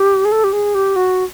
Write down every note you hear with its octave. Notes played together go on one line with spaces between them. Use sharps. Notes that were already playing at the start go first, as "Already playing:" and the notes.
Already playing: G4
G#4
A4
G4
G#4
G4
F#4